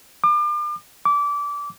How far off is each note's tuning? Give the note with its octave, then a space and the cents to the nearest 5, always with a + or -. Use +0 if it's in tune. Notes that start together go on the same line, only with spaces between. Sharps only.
D6 +40
D6 -20